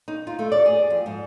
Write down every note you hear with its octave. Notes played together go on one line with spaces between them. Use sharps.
D#4
F4
A3
D5
G#4
F2
G#2